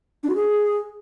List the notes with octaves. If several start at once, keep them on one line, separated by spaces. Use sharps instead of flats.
D4
F#4
G#4